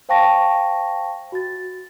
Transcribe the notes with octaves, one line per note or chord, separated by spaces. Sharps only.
C5 F5 G5 A5 C#6 A#6
F#4 A6